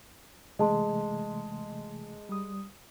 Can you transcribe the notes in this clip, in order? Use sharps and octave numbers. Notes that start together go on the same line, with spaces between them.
C3 E3 G#3 A3 D#5 A5 C6
G3 D#6